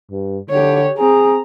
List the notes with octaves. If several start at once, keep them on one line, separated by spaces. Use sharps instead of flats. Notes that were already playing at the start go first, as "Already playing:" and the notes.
G2
D3 G4 C#5
C4 G#4 A#5